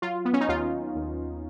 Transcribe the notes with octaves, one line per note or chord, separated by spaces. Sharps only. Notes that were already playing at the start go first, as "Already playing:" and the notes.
F#3 F4
B3
C#4
D#4
D#2 F4
D#2